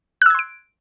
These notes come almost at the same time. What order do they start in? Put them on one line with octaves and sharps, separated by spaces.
F#6 E6 G#6 C6 D7